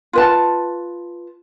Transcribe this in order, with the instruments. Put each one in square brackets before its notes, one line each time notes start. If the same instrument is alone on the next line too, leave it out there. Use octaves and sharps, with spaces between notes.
[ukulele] F4 B4 A5